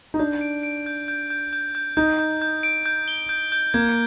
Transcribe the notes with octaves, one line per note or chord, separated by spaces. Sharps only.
D#4
D4 G6
D7
D7
G6
G6
G6
G6
G6
D#4 G6
G6
G6
D7
G6
G7
G6
G6
A#3 G#6